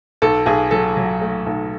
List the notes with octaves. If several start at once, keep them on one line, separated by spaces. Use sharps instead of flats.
B1 A4
B1 G#4
F#3 A4
F#3
A3
B1